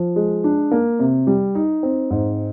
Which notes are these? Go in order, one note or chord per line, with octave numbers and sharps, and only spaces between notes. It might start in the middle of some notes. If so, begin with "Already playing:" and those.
Already playing: F3
G#3
D4
A#3
C3
G3
D#4
C4
G#2